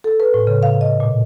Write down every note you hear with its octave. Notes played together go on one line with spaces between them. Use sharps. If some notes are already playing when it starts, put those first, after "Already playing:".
A4
B4
A2
C#3
F5
D#5
A#2